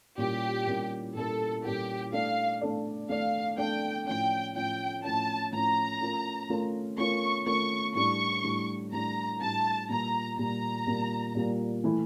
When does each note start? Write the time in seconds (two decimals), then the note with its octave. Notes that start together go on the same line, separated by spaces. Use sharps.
0.18 A#2 G3 C#4 E4 G4 A#4
0.67 A#2 G3 C#4 E4 A#4
1.15 A#2 G3 C#4 E4 A4 A#4
1.64 A#2 G3 C#4 E4 G4 A#4
2.12 A3 D4 A4 D5 F5
2.61 A3 D4 A4 D5
3.09 A3 D4 A4 D5 F5
3.58 A3 D4 A4 D5 G5
4.07 A2 F3 C#4 G5
4.55 A2 F3 C#4 G5
5.04 A2 F3 C#4 A5
5.52 A2 F3 C#4 A#5
6.01 A3 C#4 F4 A#4
6.50 A3 C#4 F4 A#4
6.98 A3 C#4 F4 A#4 C#6
7.46 A3 C#4 F4 A#4 C#6
7.95 A2 G3 D4 C#6
8.44 A2 G3 D4
8.92 A2 G3 D4 A#5
9.41 A2 G3 D4 A5
9.89 A#2 G3 A#3 A#5
10.38 A#2 G3 A#3 A#5
10.87 A#2 G3 A#3
11.35 A#2 G3 A#3
11.84 E3 A3 E4